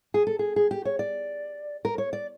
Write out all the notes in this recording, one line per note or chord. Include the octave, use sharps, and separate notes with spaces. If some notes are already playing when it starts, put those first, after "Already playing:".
G#4
A4
G#4
G#4
G4
C#5
D5
A#4
C#5
D5